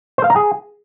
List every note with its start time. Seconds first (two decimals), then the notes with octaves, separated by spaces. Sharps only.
0.18 C5
0.24 F5
0.30 A#5
0.36 G#4